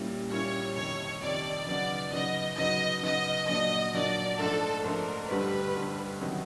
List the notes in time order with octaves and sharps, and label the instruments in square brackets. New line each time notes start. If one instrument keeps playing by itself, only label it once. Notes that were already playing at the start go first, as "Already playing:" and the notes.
Already playing: [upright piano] A#2 G3 A#3 C#4 E4
[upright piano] A#2 G3 A#3 C#4 E4 [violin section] C#5
[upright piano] F2 C3 D#3 [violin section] C#5
[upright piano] F2 C3 D#3 [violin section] D5
[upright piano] C#3 F#3 B3 D#4 F#4 [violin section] D5
[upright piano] C#3 F#3 B3 D#4 F#4 [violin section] D#5
[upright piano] C#3 F#3 B3 D#4 F#4 [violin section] D#5
[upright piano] C#3 F#3 B3 D#4 F#4 [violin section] D#5
[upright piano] A#2 F#3 A#3 D4 [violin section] D#5
[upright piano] A#2 F#3 A#3 D4 [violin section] D5
[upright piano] G#2 F3 A3 D4 [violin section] A4
[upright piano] G#2 F3 A3 D4 [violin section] A#4
[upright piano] G2 D3 G3 [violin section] B4
[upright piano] G2 D3 G3
C3 D#3 F#3 B3